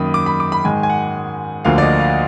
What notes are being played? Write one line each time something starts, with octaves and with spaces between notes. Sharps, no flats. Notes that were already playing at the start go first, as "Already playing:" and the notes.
Already playing: F#2 D#3 A#3 B5 D#6
D6
B5
D6
B5
G#2 D#3 G#3 G#5
G#5
F#5
D2 D3 F3 A#3 F5
D5
D#5
F5